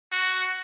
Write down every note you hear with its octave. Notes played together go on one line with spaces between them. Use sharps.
F#4